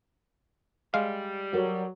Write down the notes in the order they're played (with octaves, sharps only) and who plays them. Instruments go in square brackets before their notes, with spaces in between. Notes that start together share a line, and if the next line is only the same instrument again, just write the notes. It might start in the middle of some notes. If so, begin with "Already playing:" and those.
[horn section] G3 [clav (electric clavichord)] G#3 F5
[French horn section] F#3 [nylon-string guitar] A4 A#4 D5